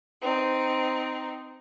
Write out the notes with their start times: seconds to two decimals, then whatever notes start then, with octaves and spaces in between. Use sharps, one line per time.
0.22 C4 D#4